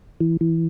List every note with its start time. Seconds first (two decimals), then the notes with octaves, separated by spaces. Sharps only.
0.21 E3
0.41 E3